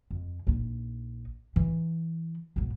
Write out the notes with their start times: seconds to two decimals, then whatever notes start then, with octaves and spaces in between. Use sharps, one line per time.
0.11 F2
0.47 A#1 D#4
1.56 E3 E4
2.56 B1 G#2